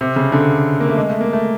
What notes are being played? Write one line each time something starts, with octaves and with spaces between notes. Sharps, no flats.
C3
C#3
D3
A#3
A3
G#3
A3
A#3
A3